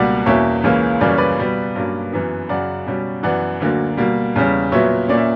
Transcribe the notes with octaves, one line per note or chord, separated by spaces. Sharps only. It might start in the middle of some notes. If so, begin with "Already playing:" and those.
Already playing: C#2 B2 G3 A#3 D5 F#5
E2 B2 A#3 C#4 C#5 E5
C#2 C#3 E3 A#3 C#4
F#2 C#3 E3 G3 A#3 D5
C#5
B4 D5
B2 G3 B3
G2 F#3 A#3 C#4
F#2 E3 B3
F#2 C#3 F#3 D5 F#5
B2 G3 C#4
F#2 E3 B3 D5 F#5
D2 D3 F#3 A#3
B2 G3 A#3
E2 C#3 G3 C#4
A#2 F#3 B3 C#5 E5
A#2 A#3 C#4 D5
E5